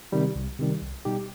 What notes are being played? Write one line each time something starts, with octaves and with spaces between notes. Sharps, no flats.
C3 D#3 G3
C2
C3 D#3 G3
C2
B2 G3 D#4 G4